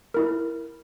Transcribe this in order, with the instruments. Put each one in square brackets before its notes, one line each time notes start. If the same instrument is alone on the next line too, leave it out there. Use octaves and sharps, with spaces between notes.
[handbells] E4 A#4